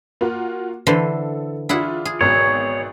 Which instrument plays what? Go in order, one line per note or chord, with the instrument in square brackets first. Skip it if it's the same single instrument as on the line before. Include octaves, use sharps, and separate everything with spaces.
[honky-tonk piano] A#3 F4 F#4
[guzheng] D3 E3 C5 [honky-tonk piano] A4
[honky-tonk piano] D4 F4 [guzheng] E4 G#4 F#5
[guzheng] G#4
[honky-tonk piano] G#1 B2 F#3 [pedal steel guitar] C#5